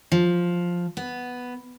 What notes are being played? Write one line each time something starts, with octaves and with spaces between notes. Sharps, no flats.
F3
B3